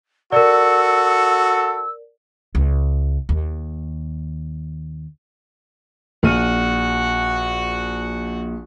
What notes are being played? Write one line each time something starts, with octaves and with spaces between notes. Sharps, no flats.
F#4 A4 A#4 D5 E6
C#2
D#2
A#1 F#4 F#5 F6 D#7